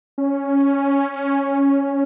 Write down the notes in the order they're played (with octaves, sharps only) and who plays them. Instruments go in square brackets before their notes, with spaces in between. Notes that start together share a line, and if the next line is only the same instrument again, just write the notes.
[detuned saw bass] C#4